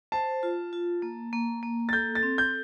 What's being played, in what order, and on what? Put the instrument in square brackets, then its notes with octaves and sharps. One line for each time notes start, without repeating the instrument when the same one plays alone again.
[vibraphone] C5 [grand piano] A5
[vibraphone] F4
F4
A#3
A#3
A#3
[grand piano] A6
[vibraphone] A4 [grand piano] G6
[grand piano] A6
[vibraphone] C4
[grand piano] G6